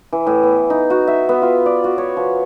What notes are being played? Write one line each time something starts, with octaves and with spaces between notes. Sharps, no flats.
E3
A2
B3
D#4
F#4
E5
B3
F4
D5
F#4
C#5
F3